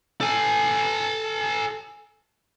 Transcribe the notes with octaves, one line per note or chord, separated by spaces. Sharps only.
A4 G#5